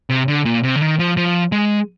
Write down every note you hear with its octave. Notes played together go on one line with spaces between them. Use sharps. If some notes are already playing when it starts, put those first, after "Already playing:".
C3
D3
A#2
C3
D3
D#3
F3
F3
G#3